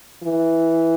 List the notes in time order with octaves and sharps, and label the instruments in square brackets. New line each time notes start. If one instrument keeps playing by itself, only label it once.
[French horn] E3